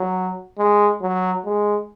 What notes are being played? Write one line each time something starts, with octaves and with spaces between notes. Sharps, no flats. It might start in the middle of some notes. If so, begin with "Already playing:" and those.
Already playing: F#3
G#3
F#3
G#3